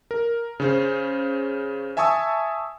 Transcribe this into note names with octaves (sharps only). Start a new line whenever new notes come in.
A#4
C#3 C#4 C5
E5 G#5 A5 C#6 D#6 E6